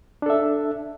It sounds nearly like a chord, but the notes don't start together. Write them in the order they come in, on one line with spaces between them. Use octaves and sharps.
D4 A4 E5